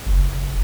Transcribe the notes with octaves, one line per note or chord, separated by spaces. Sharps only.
F#1